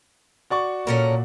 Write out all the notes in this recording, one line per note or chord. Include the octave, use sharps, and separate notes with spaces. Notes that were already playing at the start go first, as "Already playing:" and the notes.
F#4 D5 C#6
A#2 C#4 A4 A#4